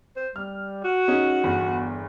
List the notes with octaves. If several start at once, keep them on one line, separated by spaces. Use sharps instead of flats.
C5
G3 F6
F#4
C#4 D#4 G#4
G1 E2 B5